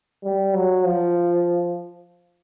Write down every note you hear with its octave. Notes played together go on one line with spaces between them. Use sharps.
G3
F#3
F3